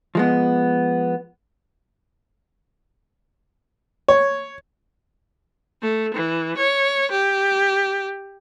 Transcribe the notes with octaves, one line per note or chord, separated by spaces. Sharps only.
F3 G#3 B3
C#5
A3
E3
C#5
G4